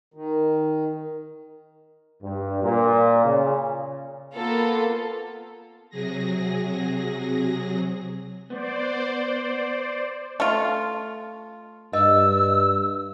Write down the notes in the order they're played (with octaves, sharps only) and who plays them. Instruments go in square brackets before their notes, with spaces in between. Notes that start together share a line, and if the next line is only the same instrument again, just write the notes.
[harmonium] D#3
[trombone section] G2
A#2
C#3
[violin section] A#3 B3 F4 A4
[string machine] C3 F#3 G#4 A#6
[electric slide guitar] B3 [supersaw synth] C5 D5
[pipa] A3 F4
[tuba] G2 [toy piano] D#5 [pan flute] E6